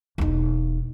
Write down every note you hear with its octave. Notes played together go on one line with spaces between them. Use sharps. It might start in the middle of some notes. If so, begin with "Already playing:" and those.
E1 D#4